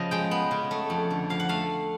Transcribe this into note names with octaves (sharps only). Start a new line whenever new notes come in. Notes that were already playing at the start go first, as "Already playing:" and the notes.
Already playing: C#3 F3 B3 D#5
G#3 G5
B3
C#3
A3
F2
D3
F3 F5
F#5
A3 F5